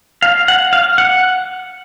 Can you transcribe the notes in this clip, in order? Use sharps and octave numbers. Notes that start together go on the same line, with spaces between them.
F5
F#5
F5
F#5